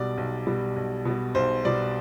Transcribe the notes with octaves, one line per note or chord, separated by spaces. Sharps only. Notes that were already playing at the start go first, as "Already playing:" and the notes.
Already playing: B1 B2 G3 D5
B1
B2 G3
B1
B2 G3
B1 C5
B2 G3 D5